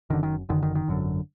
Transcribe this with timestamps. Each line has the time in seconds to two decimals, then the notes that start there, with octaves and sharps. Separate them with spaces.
0.10 F#1 F#2 D3 D#3
0.23 D#3
0.49 F#1 F#2 D3 D#3
0.63 D#3
0.75 D#3
0.88 G#1 F#2 D3